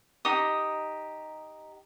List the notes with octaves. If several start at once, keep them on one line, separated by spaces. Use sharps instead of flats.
D#4 G4 D#6